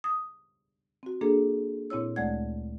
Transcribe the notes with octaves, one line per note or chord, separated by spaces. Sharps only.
D#6
C4 F#4
A#3 D4 G#4 A4
A#2 C4 E4 C#5 E6
D2 G#3 A3 D5 F#5 G#6